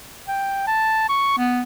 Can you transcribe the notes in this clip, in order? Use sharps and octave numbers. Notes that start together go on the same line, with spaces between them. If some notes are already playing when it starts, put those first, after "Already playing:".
G5
A5
C#6
B3